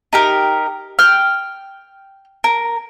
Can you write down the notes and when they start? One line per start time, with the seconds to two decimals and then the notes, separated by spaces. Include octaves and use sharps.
0.13 D#4 G4 A#4
0.99 G5 F6
2.44 A#4